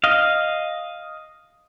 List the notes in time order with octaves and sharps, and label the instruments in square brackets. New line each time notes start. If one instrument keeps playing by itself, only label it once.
[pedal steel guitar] D#5 F5